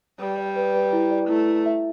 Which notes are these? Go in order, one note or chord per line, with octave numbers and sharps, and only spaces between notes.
G3 B4
D5
B4
B4
E4
D5
A3 E4
E4
E5